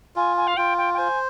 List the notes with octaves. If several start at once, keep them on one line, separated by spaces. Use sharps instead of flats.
F4 G#5
G#5
F5
F4 G5
G5
G5
C5 G#5